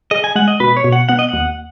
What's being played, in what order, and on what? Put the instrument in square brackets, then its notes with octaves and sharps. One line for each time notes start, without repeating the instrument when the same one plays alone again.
[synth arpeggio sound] G#4 [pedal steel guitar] D#5
[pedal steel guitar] G#5
[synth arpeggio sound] G#3 [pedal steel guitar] F#5
[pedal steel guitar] D#5
[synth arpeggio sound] B2 [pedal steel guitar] B4
[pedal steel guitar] C#5
[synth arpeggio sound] B2
[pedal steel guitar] F#5
[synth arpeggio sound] B3 [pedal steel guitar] F#5
[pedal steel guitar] D#5
[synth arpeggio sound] D#2 [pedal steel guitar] F#5